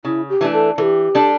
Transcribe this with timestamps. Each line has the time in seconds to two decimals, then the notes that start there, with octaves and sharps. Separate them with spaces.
0.05 C#3 E4
0.29 G4
0.41 E3 A3 D4
0.53 A4
0.78 E3 A4
0.82 G4
1.15 G3 D4 A4